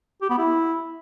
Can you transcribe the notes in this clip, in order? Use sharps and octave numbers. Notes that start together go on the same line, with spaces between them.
G4
B3
E4